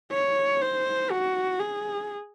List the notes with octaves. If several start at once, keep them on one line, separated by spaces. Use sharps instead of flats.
C#5
C5
F#4
G#4